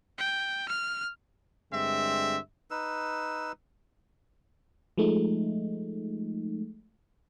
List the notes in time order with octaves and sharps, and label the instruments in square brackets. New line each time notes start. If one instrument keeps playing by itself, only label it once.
[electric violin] G5
F6
[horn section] G2 D3 G#3 C4 E5
[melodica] D#4 B4 E6
[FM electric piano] F3 G#3 A3 D#4